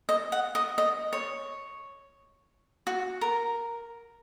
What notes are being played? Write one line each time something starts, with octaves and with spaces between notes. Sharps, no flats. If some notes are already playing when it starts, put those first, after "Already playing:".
D#5
F#5
D#5
D#5
C#5
F#4
A#4